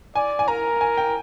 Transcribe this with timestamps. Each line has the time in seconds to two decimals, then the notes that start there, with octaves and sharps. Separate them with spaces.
0.15 D5 G#5
0.39 G#5
0.48 A#4 A#5
0.81 G#5
0.97 G5